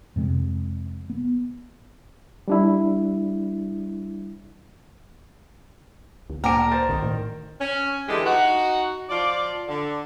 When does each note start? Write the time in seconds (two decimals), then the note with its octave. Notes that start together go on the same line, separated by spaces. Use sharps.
0.16 F2 C3 G#3
1.10 B3
2.48 G3 D4 E4
6.30 D2
6.44 A#2 A#4 G5 A5 D6 D7
6.72 C5 A6
6.89 B1 D#3
7.02 A2
7.60 C#4
8.08 D3 E3 G#3 G4
8.25 D#4 F#4
9.09 F3 F4 D5
9.68 D3